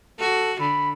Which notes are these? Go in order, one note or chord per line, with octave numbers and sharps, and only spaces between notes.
F#4 A4
D3 B5